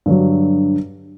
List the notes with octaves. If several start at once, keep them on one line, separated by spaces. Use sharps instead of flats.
G2 D3 F#3